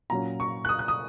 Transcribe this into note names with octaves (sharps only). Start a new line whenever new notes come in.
A#2 F#3 C#4 A#5
C#6
F#6
D#6
F#6
D#6